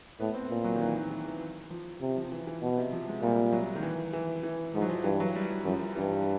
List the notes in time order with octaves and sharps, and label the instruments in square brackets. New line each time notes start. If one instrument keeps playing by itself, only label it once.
[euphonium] A2 [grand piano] B3
[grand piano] C4
[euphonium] A#2 [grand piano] B3
[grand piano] F#3
D#3
E3
D#3
E3
E3
F3
[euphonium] C3
[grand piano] F3
E3
E3
[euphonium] B2
[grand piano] C3
F3
G#3
[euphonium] A#2 [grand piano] G3
[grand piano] F#3
D#3
E3
E3
E3
[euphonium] G#2 [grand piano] F3
[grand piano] F#3
F3
[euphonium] G2 [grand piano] E3
[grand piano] F#3
G3
F#3
[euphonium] F#2 [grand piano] F3
[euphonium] G2 [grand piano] E3